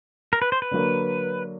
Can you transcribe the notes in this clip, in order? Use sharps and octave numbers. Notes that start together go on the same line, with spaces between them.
A#4
B4
C5
B4
D3 F#3 A#3